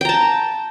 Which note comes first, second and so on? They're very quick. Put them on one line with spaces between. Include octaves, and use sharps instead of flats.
G5 A#5 A5